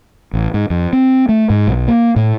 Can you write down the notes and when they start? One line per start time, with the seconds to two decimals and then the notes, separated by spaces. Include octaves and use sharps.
0.33 A1
0.54 G#2
0.70 F2
0.93 C4
1.29 A3
1.50 G#2
1.67 B1
1.88 A#3
2.16 A2